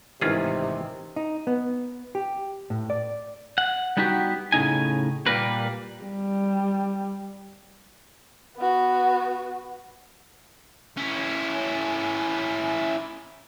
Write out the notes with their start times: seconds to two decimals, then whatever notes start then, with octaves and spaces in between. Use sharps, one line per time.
0.21 A1 G#2 C3 D#3 E3 C#4 F4 G#4
1.16 D#4
1.47 B3
2.15 G4
2.70 A2
2.90 D5
3.58 F#5
3.97 G3 B3 D#4 F#4 G4
4.52 A2 C#3 D#4 G#5
5.26 A#2 G3 A#3 A#4 B4
6.04 G3
8.57 B3 F#4
10.97 C#4 E4